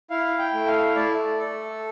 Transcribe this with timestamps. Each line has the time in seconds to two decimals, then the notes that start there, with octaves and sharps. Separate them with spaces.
0.10 E4 F5
0.39 G5
0.53 A3
0.67 F5
0.95 A3 D5
1.38 A4